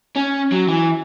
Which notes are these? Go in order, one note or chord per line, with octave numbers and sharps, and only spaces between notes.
C#4
F#3
E3